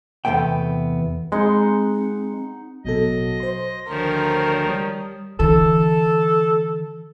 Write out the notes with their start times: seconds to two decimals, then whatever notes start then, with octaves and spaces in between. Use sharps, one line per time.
0.25 E2 C3 A3 B3 G5
1.32 G#3 C4 D#4 F#5 C6
2.85 A1 B2 F#3 A4 D#5
3.40 C5 C6
3.88 D2 D#3 F3 A#4 C#5
4.69 G3 D#6
5.40 D3 E3 A4